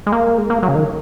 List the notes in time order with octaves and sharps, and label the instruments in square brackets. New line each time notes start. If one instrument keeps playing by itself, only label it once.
[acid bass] G#3
A#3
G#3
A#3
F#3
C#3
D#3